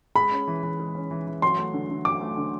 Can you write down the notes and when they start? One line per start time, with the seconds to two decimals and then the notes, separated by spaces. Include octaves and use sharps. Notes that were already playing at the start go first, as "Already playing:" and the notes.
0.15 G#3 B5
0.31 C#4
0.48 E3
0.63 E3
0.80 G#3
0.95 C#4
1.11 E3
1.27 E3
1.42 F#3 C6
1.58 A3
1.74 D3
1.90 D3
2.05 F#3 D6
2.21 A3
2.37 D3